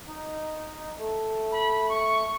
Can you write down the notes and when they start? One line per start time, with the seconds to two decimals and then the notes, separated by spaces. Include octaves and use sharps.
0.07 D#4
0.98 A3
1.52 B5
1.89 C#6